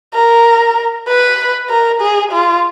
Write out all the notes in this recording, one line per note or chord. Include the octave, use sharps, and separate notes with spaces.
A#4
B4
A#4
G#4
F4